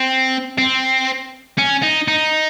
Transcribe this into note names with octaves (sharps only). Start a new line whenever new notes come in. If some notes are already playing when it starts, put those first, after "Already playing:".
Already playing: C4
C4
C#4
D#4
D#4